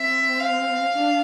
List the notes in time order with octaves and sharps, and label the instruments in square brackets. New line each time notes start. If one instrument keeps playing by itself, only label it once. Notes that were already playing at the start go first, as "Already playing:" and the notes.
Already playing: [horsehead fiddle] C4 [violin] E5
[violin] F5
[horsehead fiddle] D4